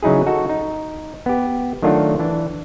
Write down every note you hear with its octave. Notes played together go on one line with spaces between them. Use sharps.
C#3 F#3 D#4 E4 G#4
D#4 F#4 A4
D#4
B3 G4
D#3 F#3 A3 D4 F4 F#4
E3 D4